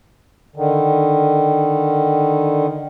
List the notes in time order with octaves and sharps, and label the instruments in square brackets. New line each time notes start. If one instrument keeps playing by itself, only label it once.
[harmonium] D3 D#3